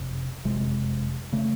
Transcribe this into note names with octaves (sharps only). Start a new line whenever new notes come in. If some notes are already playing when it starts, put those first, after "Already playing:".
Already playing: F#1 F2 C3
F#1 F2 C3 G#3
C#3 A3